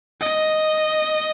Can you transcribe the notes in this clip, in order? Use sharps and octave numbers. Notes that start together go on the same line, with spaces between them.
D#5